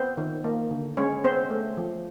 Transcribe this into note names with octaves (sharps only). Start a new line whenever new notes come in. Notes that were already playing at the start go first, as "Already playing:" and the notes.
Already playing: B3 C4 C5
D#3
A#3
D3
G#3 C#4 C#5
B3 C4 C5
A3
F3